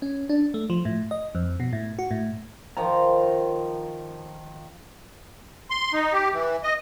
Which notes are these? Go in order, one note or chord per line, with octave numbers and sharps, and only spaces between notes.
C#4
D4
A3
F3
A2
D#5
F2
B2
A2
F#4
A2
D#3 F3 A#5
C6
D#4
G4
E3
D#5